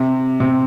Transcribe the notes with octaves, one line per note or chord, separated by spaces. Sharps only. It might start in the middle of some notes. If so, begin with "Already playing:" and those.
Already playing: C3
C3